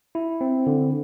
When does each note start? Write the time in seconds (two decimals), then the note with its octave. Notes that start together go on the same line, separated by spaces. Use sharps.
0.15 E4
0.41 C4
0.67 D3